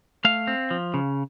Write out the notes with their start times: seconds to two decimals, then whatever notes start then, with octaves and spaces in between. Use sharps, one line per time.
0.25 A3 F5
0.47 C4
0.71 F3
0.94 C#3